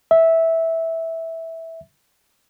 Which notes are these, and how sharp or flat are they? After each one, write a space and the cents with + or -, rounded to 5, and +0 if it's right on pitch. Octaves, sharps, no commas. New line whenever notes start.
E5 -10